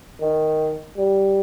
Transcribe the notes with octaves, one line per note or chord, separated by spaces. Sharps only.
D#3
G3